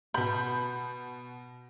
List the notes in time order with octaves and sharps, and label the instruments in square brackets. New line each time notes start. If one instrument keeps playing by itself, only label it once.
[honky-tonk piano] B2 G6 [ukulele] B5